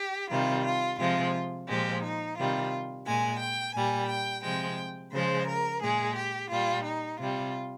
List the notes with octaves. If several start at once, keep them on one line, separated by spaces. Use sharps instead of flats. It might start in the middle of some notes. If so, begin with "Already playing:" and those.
Already playing: G4
C3 D#3 G3 F4
F4
C3 F3 G#3 F4
A#2 F3 G#3 G4
D#4
C3 D#3 G3 F4
A#2 G#3 G#5
G5
A#2 G3 G#5
G5
C3 F3 G#3 G5
C#3 F3 G#3 C5
A#4
A#2 G#3 G#4
G4
A#2 G3 F4
D#4
C3 G3 F4